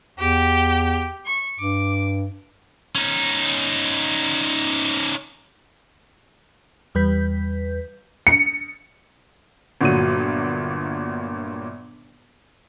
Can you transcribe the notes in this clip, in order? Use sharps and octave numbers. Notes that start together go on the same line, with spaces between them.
E2 G4 G5
C#6
G2 D6
C#4 D#4
E2 G3 B4 G6 B6
C#7
G1 A#2 F#3 F#4 D#7